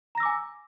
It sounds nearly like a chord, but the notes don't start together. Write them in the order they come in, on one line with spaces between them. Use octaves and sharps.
A#5 A#6 E6 D6 G#5